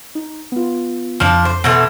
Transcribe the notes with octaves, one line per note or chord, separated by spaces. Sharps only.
D#4
B3 F4
F2 F3 D4 D6
C5
B2 E3 A3 C6 G#6 A#6